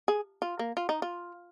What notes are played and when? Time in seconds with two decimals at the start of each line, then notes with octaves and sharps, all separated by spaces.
0.08 G#4
0.42 F4
0.59 A#3
0.77 F4
0.89 D#4
1.02 F4